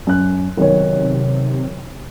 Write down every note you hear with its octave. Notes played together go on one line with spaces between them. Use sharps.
F#2 F#6
B1 C3 D#3 C#5